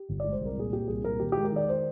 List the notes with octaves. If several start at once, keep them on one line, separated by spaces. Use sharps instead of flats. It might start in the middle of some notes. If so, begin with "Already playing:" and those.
Already playing: G4
G1
G#3 D5
C5
C2 A#4
A#2 G#4
A#2 G4
C2 G#4
A#2 A#4
D#3 G4
G#3 G4
A#4
D#3 D5
C5